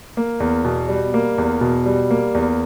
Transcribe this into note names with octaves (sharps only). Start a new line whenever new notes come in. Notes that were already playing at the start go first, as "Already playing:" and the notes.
A#3
E2
B2
G3
A#3
E2
B2
G3
A#3
E2